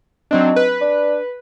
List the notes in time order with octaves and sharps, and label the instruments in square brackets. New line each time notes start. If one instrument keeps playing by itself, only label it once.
[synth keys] F#3 C4 D4 [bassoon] D#4
[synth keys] B4
[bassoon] D4